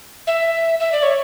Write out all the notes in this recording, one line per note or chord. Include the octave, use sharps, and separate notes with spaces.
E5
E5
D5
C#5